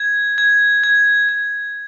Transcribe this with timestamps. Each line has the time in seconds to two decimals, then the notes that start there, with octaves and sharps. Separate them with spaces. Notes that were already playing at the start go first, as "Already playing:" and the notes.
Already playing: G#6
0.38 G#6
0.84 G#6
1.29 G#6